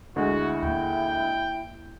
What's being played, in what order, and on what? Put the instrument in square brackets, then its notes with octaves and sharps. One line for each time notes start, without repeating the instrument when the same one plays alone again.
[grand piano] D2 G#3 [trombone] E4 [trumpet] F#4
[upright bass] D#2 D#4 [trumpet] G5